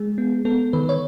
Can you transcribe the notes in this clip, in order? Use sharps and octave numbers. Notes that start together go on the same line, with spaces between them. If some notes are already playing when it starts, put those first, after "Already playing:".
Already playing: G#3 G#4
B3
B3 A4
D#3 B4
C#5